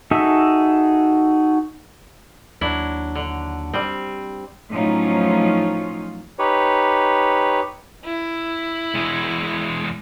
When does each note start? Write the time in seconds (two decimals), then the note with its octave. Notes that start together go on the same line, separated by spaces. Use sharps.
0.11 D#4 F#4 G#4 A4 E5
2.61 D#2 F#3 D4 E4
3.15 D3
3.73 G3 C4
4.70 A2 F3 F#3 C#4 D#4 F4
6.39 D#4 G4 B4 C#5
8.05 E4
8.95 E2 G#3